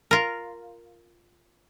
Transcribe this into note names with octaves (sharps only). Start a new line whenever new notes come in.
F4 A#4